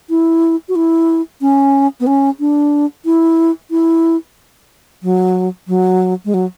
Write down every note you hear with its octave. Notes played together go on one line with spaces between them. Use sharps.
E4
F#4
E4
C#4
B3
C#4
D4
E4
E4
F#3
F#3
G#3
F#3